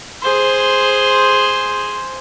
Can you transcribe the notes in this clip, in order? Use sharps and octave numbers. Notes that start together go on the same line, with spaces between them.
G#4 C5